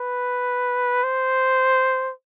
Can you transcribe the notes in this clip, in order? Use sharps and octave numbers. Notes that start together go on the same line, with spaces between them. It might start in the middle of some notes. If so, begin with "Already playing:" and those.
Already playing: B4
C5